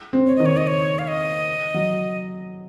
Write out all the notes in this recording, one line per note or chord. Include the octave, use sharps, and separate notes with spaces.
C4
C#5
D#3 D#5
C#5
D#5
C#5
F5
D#5
F#3